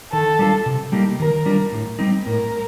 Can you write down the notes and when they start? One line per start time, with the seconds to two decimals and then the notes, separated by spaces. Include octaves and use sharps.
0.12 D#3 A4
0.39 G3 D4 F4
0.66 C3
0.92 G3 A#3 D#4 G4
1.19 D#3 A#4
1.46 G3 D4 F4
1.72 A2
1.99 G3 C4 D#4
2.26 A2 A#4